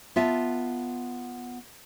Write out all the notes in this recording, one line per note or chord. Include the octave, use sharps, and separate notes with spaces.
B3 F4 E5 A5